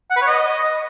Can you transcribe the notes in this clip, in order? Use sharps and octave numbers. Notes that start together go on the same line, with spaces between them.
F#5
B4
C#5
D#5